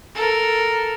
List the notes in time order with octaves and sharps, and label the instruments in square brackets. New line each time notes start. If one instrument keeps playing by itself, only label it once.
[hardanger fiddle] A4 A#4